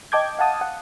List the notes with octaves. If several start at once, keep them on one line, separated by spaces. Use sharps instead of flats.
D#5 G5 A5 D6 G6 G#6
F5 F#5 A5 D#6
F#5